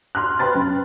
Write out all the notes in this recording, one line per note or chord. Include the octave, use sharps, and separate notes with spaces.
C6 F6 F#6
B4 G5 B5 C6 A6
F#2